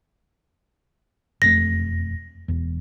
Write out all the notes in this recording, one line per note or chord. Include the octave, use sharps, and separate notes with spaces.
E1 F2 A3 A#6
E1 E2